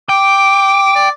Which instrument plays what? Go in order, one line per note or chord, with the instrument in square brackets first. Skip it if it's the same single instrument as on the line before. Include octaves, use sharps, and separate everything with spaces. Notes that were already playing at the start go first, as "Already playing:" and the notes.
[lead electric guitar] G5 [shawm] D6
[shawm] D5